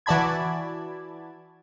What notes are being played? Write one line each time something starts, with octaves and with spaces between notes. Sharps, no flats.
E3 F#4 D5 A5 B5 G#6